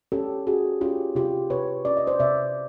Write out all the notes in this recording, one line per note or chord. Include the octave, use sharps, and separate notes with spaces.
C#4 G4 A4
C#4 F#4 G#4
C#4 F4 G4
C3 F4 G4
C3 B4 C#5
C#4 D5
D#5
C5 D5
C3 D5 E5